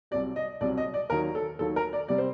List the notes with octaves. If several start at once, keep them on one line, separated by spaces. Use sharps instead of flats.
C2 C3 F#3 D5
D#5
C2 C3 F#3 D5
D#5
D5
D#2 D#3 F#3 A#4
A4
D#2 D#3 F#3 A4
A#4
D5
C3 G3 D5
C5